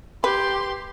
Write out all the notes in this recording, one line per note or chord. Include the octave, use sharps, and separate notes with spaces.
G4 B4 C6